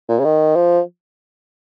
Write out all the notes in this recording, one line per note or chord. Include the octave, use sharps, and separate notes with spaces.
A#2
C#3
D#3
F3